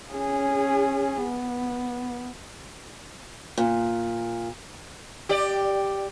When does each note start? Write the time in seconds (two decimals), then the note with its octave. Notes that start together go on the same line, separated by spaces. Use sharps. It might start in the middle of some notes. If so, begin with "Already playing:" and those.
0.12 C#4 G#4
1.22 B3
3.58 A#2
5.29 G4 D5